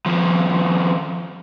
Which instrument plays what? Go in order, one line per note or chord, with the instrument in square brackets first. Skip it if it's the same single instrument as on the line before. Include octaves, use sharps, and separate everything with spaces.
[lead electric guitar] D#2 F3